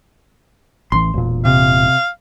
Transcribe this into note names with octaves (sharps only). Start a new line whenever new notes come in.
A1 E3 C6
E1 A#2
C3 F5